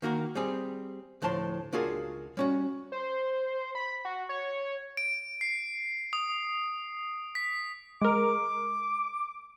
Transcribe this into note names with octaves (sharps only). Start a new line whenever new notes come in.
D#3 A#3 F#4 A#4
G3 C4 G#4
D2 A2 F3 A5 C6
C#2 D4 F4 F#4 G#4 A#4
G3 C#4 F#4
C5
B5
F#4
C#5
D7
C7
D#6
B6
G#3 A#4 D6